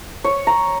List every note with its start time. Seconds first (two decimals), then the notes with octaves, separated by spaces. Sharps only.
0.24 C#5
0.47 A#5